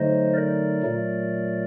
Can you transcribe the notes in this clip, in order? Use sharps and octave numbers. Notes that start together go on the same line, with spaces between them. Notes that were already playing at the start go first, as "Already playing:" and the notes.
Already playing: D3 F#3 A3 D#4 C5 D#5
A#4 D5
A#2 F#3 A3